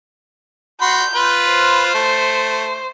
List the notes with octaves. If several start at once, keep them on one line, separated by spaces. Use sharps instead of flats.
F#4 B5 C6 G6
F4 B4
C5
A3